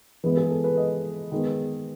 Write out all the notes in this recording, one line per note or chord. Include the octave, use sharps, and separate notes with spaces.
E3 G#3 B3 B4
G#4
A4
B4
D#5
D#3 G#3 B3